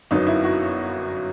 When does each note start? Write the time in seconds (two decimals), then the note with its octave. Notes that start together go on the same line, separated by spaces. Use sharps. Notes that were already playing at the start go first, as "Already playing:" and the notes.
0.11 G1 F#2 F#3 B3 D#4
0.27 E4
0.44 F#4